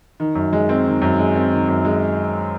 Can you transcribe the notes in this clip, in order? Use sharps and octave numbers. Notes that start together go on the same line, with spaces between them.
D#3
F#2
G#3
C4
D#3
F#2
G#3
C4
D#3
F#2
G#3